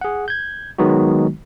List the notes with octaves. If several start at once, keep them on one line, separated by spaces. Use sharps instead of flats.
G#4 F#5
G6 G#6
D#3 F#3 G#3 B3 D#4 F#4